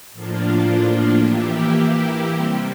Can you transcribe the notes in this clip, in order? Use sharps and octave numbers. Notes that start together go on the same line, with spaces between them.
A2 F3 A#3 D4 F4
E3 A#3 E4 G4
C3 G3 C4